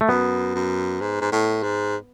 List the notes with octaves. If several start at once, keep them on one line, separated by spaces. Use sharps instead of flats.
A3
F#2 B3
F#2
G#2
G#2
A2
G#2